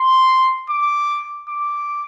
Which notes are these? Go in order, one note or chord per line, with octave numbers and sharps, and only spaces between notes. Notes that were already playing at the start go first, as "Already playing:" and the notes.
Already playing: C6
D6
D6